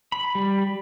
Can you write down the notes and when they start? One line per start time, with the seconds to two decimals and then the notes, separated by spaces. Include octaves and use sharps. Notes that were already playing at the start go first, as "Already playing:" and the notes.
0.12 B5
0.35 G3